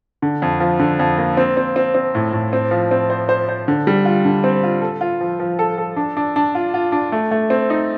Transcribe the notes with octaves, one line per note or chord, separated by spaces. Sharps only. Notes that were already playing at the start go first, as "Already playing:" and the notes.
D3
F2
F3
D3
F2
A#3
C4
C4
C4
C4
A2
A2
C4
F3
C4
C5
C5
C5
D3
G3
F4
D3
C4
F4
A4
F4
F3
F3
A4
A4
D4
D4
D4
F4
F4
D4
A3
A3
C4
D#4